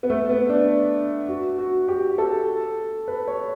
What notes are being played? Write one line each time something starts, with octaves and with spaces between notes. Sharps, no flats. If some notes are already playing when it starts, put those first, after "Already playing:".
B3
A3
B3
D4
F#4
F#4
G4
A4
B4
C#5